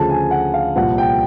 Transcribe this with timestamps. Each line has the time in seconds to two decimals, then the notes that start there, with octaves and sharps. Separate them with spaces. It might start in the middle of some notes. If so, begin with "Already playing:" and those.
Already playing: D2 C#3 F3 A5
0.10 G#5
0.31 F#5
0.54 F5
0.75 C2 A#2 F3 F#5
0.98 G5